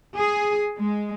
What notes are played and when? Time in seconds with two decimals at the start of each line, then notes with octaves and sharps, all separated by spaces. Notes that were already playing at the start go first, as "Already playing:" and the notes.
0.18 G#4
0.77 G#3